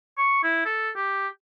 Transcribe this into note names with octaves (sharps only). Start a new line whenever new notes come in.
C#6
E4
A4
G4